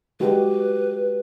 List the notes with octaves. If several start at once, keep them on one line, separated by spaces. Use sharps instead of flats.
G#3 F#4 G4 B4